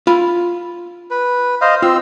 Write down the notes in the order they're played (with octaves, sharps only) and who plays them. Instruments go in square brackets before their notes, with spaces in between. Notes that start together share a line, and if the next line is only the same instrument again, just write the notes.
[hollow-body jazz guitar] F4 B5
[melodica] B4
C5 D#5 F5
[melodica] C4 E6 [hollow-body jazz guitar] F4